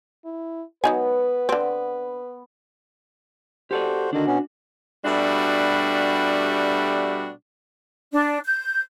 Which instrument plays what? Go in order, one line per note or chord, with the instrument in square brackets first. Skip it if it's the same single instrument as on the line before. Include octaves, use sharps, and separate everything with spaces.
[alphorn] E4
[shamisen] F#3 D#4 G#5 [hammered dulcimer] B3 [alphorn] B4
[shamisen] D3 C4
[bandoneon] F#4 C5 [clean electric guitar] G4 A4 D5
[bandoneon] D3 D#3 [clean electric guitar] D4 F#4
[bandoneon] B2 B3 C#4
[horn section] B2 G3 A3 D4 F#4 G4
[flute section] D4
G6